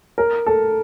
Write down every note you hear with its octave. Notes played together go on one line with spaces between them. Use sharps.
A#4
A4